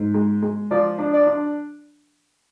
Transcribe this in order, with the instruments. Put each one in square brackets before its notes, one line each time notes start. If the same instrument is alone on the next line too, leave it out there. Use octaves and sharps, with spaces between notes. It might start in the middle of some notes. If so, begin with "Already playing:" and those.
Already playing: [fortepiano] G#2
G#3
G#3
[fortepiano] F3 [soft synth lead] D5
[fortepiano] D4
[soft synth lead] D5
[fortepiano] D4